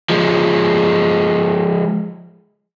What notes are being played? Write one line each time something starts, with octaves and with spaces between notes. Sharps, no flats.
F3 G#3